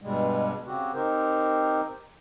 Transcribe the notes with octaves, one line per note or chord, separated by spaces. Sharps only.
G2 B2 G3 G#3
C#3 C4 F#4 G4
C4 D#4 G4 A#4 C5